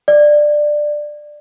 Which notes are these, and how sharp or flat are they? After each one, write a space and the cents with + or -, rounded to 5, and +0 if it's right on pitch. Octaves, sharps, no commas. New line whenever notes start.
D5 +15